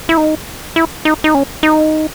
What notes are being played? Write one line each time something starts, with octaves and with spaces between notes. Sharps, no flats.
E4
D#4
E4
D#4
D#4
C#4
D#4